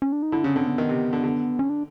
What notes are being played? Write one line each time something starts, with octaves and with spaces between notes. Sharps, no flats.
C#4
D4
D#4
D3 E4
C#3 C#4
D3 C4
B3
D#3
C3
D3
D3
C#4
D4